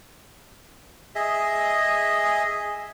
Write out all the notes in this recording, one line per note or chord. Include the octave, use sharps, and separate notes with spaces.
G#4 D#5 E5